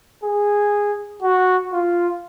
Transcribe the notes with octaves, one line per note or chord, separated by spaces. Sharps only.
G#4
F#4
F4